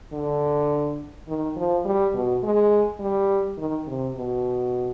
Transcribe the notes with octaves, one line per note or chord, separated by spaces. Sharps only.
D3
D#3
F3
G3
B2
G#3
G3
D#3
C3
B2